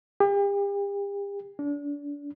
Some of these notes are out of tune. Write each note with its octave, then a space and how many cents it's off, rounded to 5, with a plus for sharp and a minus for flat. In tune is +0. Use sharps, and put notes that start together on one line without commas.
G4 +40
D4 -30